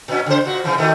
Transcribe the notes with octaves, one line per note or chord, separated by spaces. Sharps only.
A#2 C#4
C#3 C5
A#2 F#4
C3 E3 F3
A#2 D#3 A3